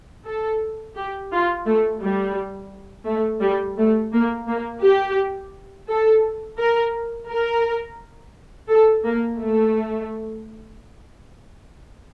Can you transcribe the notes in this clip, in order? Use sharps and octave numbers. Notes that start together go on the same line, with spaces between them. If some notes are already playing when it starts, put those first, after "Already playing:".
A4
G4
F4
A3
G3
A3
G3
A3
A#3
A#3
G4
A4
A#4
A#4
A4
A#3
A3